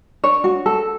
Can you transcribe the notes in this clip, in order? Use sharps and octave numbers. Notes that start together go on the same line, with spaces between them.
D4 C#5
F#4
A4